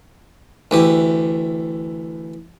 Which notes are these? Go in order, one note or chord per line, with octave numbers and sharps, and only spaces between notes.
D2 E3 G4